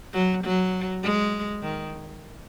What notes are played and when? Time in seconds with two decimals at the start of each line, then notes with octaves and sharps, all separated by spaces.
0.13 F#3
0.44 F#3
1.03 G#3
1.62 D#3